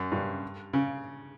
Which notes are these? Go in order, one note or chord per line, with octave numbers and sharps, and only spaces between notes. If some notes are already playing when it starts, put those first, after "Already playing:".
Already playing: F#2
G2
C#3